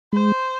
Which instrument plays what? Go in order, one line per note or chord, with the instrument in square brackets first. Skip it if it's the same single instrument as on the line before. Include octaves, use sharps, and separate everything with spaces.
[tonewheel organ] G#3 [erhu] C5